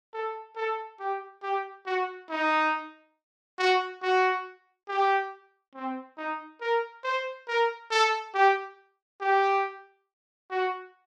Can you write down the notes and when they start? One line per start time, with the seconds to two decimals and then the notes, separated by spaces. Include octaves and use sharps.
0.14 A4
0.56 A4
0.99 G4
1.42 G4
1.86 F#4
2.30 D#4
3.58 F#4
4.02 F#4
4.88 G4
5.74 C4
6.17 D#4
6.61 A#4
7.04 C5
7.48 A#4
7.91 A4
8.34 G4
9.21 G4
10.50 F#4